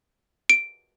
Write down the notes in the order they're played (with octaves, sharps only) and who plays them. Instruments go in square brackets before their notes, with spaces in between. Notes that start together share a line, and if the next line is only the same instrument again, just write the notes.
[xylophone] D7